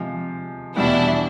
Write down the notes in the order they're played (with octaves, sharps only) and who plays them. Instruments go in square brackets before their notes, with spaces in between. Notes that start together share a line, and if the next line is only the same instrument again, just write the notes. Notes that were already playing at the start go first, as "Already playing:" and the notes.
Already playing: [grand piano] C3 F3 G#3
[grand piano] E2 B2 G3 B3 [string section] D4 E4